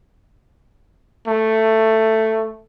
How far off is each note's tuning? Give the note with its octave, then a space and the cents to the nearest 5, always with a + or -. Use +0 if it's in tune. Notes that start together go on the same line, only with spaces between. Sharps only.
A3 +10